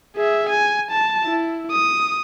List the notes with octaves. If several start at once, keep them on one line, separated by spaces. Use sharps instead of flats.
G#4 E5
G#5
A5
E4
D#6